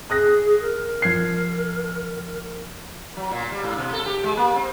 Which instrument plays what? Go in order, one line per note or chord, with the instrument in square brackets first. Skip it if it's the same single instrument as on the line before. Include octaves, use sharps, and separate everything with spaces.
[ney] G#4 [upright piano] D#6 F#6 A#6
[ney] A#4
[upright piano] F3 G#6 C7
[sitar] F#3
A#2
G3
G#2
B2
A4
G4
G#3
A#3
C4